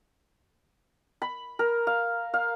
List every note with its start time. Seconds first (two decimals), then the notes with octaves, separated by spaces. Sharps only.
1.22 B5
1.59 A#4
1.87 F5
2.34 F5